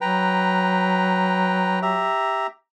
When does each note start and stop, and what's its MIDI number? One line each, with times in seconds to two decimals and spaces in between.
0.01 2.09 54
0.01 1.79 71
0.01 1.79 79
0.01 1.79 82
1.82 2.47 67
1.82 2.47 76
1.82 2.47 82